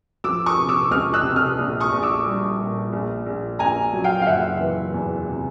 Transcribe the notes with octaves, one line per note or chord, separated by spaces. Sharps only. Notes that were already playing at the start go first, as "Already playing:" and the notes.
F3 D6 E6
C#6 D#6
C3
D6 E6
C#2 D#6 F6
E6 F#6
C3
D#6 F6
A#1
C#6 D#6
A#1
D6 E6
G3
A#2
A#1
A#1
A#1 G#5 A#5
F#3
F5 G5
F5
F#1 E5 F#5
E3
E2
C3